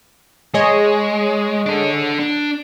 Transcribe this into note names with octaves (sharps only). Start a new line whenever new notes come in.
G#3 G#4 C#5 D#5
D4 A4
D4